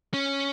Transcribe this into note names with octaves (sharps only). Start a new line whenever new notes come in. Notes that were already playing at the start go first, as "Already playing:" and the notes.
C#4